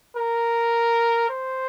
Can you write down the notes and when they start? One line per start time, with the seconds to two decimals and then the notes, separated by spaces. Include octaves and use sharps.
0.16 A#4
1.29 C5